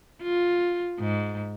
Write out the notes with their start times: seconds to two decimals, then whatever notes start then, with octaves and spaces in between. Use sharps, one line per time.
0.22 F4
1.00 G#2